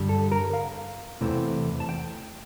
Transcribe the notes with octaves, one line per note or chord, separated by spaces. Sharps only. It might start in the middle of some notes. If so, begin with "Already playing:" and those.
Already playing: G2 D3 G3
A4
A#4
F5
E2 C3 E3 A3 C4
A5
G5